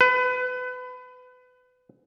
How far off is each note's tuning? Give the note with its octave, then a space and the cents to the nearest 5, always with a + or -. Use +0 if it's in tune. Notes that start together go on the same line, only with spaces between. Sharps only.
B4 +25